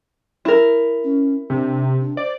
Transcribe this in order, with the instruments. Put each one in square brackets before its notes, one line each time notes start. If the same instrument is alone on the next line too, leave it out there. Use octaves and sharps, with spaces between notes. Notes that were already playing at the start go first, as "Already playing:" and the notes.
[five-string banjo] E4 A#4
[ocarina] C#4
[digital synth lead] C3 [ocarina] D4
[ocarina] D4
[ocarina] C5 [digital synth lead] D5